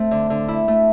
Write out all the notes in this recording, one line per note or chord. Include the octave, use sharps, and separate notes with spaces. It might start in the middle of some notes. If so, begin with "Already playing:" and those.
Already playing: A3 C4
D3
D3
E4
A3